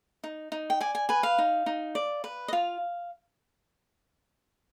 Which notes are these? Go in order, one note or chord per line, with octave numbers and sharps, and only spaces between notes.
D#4
D#4
G5
D5 G#5
G#5
B4 G#5
F5
D#4
D#4
D5
B4
D#5
F4 F5